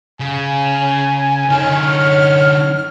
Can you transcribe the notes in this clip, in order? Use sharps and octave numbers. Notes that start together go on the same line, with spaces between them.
C#3 G#5
D3 D#4 C#5 F6